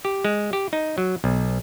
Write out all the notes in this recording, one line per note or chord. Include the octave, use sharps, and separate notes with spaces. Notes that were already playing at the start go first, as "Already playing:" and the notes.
G4
G#3
G4
D#4
F#3
B1